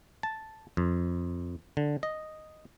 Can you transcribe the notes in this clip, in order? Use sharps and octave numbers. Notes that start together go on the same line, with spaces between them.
A5
F2
D3
D#5